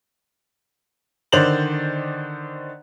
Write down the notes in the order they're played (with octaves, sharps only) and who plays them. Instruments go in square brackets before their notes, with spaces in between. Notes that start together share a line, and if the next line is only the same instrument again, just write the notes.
[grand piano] D3 D#3 C5 D5 F7 F#7